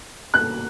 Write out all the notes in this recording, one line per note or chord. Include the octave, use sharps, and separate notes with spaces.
F#6